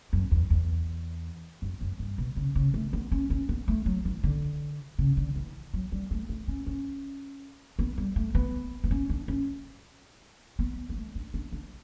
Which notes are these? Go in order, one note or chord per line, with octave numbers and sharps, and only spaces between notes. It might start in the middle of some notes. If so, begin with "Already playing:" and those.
F#2
E2
E2
F#2
F#2
G2
B2
C#3
C#3
A3
B3
C#4
C#4
B3
A3
F#3
E3
D3
C#3
D3
E3
F#3
G3
A3
A3
C#4
C#4
B3
G3
A3
B3
B3
C#4
D4
C#4
B3
B3
A3
D4
D4
D4